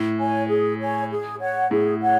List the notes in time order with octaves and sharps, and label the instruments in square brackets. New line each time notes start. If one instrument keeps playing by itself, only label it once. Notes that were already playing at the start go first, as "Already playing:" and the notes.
Already playing: [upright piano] A2
[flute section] C#5 G#5
G#4
C#5 G#5
G#4
C#5 F#5
[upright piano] A2 [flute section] G#4
[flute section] C#5 F#5